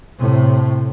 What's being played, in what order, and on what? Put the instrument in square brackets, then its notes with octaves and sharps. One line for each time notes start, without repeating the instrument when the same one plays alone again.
[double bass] A2 C3